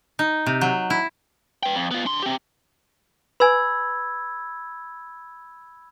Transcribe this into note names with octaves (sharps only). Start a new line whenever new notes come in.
D#4
C3
F#3
E4
B4 G5
F2
B3 F4
D4 C6
C4 G4
B4 G#5 B5 E6 G#6